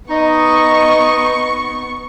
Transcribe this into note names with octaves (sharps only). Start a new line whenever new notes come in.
B3 D#4 D#5 C#6